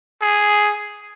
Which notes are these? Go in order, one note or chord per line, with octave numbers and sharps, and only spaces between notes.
G#4